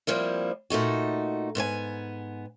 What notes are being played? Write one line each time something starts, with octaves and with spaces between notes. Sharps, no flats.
F2 F3 G3 A#3 E4
A#2 A3 D#4 F#4
G#2 B3 C5 G#5